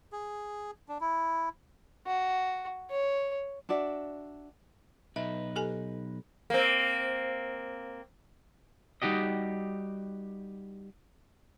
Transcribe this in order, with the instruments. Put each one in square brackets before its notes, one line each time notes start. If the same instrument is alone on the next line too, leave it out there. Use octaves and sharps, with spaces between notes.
[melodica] G#4
D4
E4
[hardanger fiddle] F#4
C#5
[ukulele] D4 F#4 D5 E5
[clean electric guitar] B1 D#4 B4 [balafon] E5
[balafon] G4 A4 G#5
[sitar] A#3 C4
[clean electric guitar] G3 D#4 F#4 G4 D#5